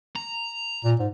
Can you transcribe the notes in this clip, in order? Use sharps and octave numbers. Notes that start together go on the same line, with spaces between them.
A#5
A#2
G#2